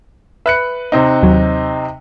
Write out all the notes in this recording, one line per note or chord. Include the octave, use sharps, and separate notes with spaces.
B4 E5 F#6 C#7
C3 C4 D#4
D#2 F#3